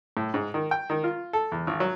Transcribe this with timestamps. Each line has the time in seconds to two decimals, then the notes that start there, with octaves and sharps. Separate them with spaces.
0.17 A2
0.34 G#2
0.54 D#3
0.71 G5
0.90 D#3
1.04 F4
1.33 A4
1.52 E2
1.67 G#1
1.80 F#3